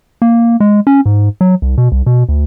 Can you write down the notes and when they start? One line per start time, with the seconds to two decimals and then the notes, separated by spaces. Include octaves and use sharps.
0.22 A#3
0.60 G#3
0.87 C#4
1.06 G#2
1.41 F#3
1.62 C2
1.78 B2
1.92 C2
2.06 B2
2.29 D2